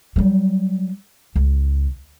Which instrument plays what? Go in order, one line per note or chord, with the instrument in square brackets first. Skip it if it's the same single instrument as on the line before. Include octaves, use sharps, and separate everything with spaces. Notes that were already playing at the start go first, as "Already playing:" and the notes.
[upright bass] F#3 G3
C#2